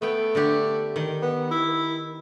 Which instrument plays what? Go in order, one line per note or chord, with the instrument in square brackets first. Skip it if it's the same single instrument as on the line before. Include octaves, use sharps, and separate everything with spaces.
[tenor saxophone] A3 [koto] B3 G5
[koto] D3 D4 G4
D#3
[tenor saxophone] B3
E4